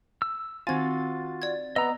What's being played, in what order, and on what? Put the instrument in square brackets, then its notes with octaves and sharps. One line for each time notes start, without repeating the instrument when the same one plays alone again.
[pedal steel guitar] E6
[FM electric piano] D#3 C4 A6 [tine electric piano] F4 F#4 [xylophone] G#5 G#6
[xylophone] D5 G#6
[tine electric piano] B3 B4 [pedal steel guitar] D#5 A#5 [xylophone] E6